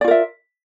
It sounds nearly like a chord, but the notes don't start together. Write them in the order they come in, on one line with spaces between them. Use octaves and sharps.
D5 F4 A#4 E5